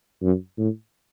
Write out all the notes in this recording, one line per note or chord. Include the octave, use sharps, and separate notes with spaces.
F#2
A2